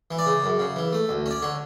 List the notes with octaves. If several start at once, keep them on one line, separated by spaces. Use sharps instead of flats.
E3
D5
C#3
F#2
C#3
E3
A3
D2
C#4 D5
D3 C#5